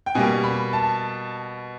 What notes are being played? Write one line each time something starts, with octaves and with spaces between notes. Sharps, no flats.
G5
B2 G3 A#3 G#5
B5
A5